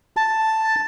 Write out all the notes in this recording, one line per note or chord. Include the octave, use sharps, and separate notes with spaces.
A5